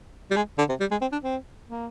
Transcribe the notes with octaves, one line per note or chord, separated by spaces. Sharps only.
G3
G#3
D3
C3
G3
G#3
C4
D4
C4
A#3